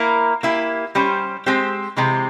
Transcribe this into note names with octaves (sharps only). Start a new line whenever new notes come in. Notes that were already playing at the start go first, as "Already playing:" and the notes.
Already playing: A#3 E4 A#4
A#3 E4 G4
G3 C#4 G4 C5
G#3 C4 G4 C5
C3 E3 G#3 C4 G4